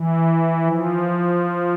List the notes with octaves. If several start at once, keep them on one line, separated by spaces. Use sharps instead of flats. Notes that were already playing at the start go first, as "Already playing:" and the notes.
Already playing: E3
F3